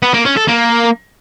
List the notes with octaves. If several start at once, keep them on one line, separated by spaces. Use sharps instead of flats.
B3
A#3
C#4
A4
A#3